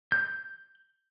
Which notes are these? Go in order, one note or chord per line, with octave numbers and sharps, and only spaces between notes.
G6